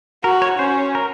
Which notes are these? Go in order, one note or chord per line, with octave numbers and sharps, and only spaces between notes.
F#4 A#4
C#5
C#4 C5
A#4